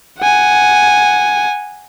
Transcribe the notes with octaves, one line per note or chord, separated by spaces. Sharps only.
F#5 G#5